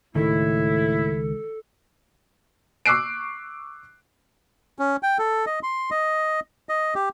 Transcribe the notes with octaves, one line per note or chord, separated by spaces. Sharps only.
C#2 A2 D#3 E4 A4
C#6 D6 E6 F#6 C7 D7
C#4
G5
A4
D#5
C6
D#5
D#5
G4